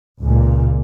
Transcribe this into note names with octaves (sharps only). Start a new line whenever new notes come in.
C#2 A#2 C#3